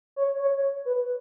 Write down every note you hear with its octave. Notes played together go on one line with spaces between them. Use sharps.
C#5
C#5
B4